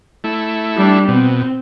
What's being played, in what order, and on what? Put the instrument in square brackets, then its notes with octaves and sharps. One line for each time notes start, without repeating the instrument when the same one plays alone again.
[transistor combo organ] A3 E4
[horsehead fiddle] G3 D4
[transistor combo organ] B2 [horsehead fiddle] C4